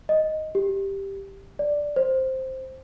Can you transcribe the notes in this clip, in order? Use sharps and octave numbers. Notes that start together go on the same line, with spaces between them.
D#5
G4
D5
C5